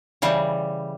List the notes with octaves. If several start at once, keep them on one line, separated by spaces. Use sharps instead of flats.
C#3 E3 G3